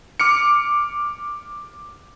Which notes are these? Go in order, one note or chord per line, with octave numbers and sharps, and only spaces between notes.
D6 F6 C#7